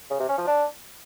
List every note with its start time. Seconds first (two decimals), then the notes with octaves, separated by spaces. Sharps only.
0.10 C#3
0.19 C3
0.29 C#4
0.38 F3
0.47 D4